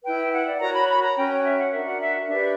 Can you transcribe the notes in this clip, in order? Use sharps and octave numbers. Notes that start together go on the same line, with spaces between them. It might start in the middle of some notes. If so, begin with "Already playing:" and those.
E4 B4 G5
F#5
D5
F#4 A#4 C#5 A#5
B5
B5
A#5
C#4 F#4 C#5 G5
E5
F#5
D4 F#4 A#4 E5
F#5
E5
D4 G4 B4 E5